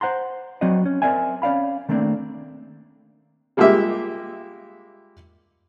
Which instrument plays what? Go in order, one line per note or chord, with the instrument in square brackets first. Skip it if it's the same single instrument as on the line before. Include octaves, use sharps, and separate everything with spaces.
[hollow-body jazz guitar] C5 F#5 A#5 C6
F#3 C4 F#4 D5 D#5
C#4
C4 A#4 D5 E5 G#5
C#4 D5 F5 B5
D#3 A3 A#3 C4 D4
[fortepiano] G3 G#3 A#3 F4 G4 E5